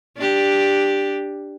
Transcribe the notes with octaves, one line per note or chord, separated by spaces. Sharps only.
D4 G4